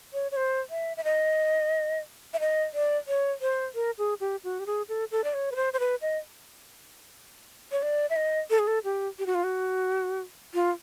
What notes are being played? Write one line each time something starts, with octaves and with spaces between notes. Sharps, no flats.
C#5
C#5
C5
E5
E5
D#5
E5
D#5
D5
C#5
C5
A#4
G#4
G4
F#4
G4
G#4
A4
A4
D5
C#5
B4
C5
C5
B4
D#5
C#5
D5
E5
D#5
A4
G#4
A4
G4
G4
F#4
F4
F#4
F4